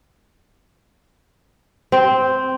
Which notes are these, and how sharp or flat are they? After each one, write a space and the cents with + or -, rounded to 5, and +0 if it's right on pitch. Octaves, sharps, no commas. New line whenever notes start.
C4 -5